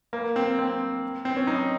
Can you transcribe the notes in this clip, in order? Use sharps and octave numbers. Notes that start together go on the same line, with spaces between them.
A#3
C4
C4
C4
C#4
D#4